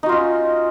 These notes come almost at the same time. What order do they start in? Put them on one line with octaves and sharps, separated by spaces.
D#4 F#4 F4 C#4